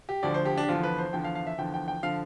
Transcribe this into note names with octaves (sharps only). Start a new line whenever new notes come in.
G4
D2 D3 F3 D5
C5
G4
D4
G4
E2 D3 F3 F4
B4
C5
E2 D3 F3 G5
F5
F5
E5
E2 D3 F3 G5
G5
G5
D3 F3 F5